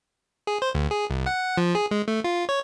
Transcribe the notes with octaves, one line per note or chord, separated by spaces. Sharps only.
G#4
C5
D2
G#4
C2
F#5
F3
G#4
G#3
A3
F4
C#5